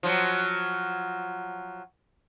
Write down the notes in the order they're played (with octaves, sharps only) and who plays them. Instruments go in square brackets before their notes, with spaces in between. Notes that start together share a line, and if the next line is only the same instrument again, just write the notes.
[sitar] F3 F#3